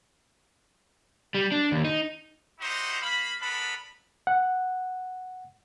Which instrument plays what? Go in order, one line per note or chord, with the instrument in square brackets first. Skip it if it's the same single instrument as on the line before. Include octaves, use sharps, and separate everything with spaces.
[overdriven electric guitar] G3
D4
D#2
D#4
[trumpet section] D#4 E4 F#4 G4 C5
A#3 F5 B5
B3 D4 A4 A#4 B5
[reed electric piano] F#5